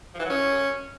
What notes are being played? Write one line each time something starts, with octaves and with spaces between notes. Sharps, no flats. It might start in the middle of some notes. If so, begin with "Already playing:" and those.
F3
E3
F#3
C#4